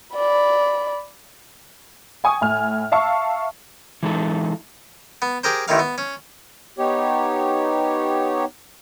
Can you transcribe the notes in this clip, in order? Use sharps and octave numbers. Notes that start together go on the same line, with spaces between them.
D5 B5
G5 G#5 C#6 D#6
A2 G#5 F6
E5 F5 A5 C#6 E6
E3 G#3 D#4 A4
B3
G4 G#4 A#4 C5
A1 A2 D#3 F5
B3
C#4
B3 D#4 G4 C#5